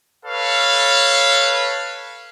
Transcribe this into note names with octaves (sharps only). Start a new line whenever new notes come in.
A4 B4 C#5 F5